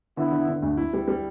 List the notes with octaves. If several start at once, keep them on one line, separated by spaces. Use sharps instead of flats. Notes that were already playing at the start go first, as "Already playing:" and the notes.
D3 B3 E4
D3
D3
D2
E4
G3
G3